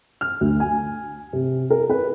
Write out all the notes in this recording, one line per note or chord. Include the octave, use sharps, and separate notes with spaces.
F6
D2
G#5
C3
A#4
B4